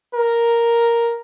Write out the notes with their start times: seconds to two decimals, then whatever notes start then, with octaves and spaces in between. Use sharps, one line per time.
0.14 A#4